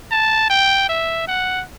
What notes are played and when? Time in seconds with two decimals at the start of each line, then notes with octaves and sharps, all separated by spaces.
0.11 A5
0.50 G5
0.89 E5
1.28 F#5